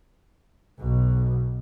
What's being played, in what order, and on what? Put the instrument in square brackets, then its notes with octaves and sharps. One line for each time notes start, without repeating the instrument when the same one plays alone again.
[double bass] B1 B2